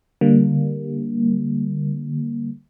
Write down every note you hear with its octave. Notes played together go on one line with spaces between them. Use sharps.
D3 G3 A#3